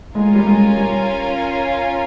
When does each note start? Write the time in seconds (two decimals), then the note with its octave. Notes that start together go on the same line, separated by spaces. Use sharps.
0.15 G#3 C#4 F4 A#4 F5 G#5
0.35 G3
0.47 G#3
0.77 G3